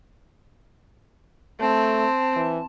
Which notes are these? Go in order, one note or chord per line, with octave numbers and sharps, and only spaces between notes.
A3 C4 A5
E3